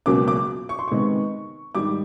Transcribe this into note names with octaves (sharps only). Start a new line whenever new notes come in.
C#2 B2 F#3 A#3 C#4 D6
D6
C#6
C6
C3 D#3 G#3 B3 C#6
G#2 D#3 G3 D6